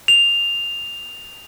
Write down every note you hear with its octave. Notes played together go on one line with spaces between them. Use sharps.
F7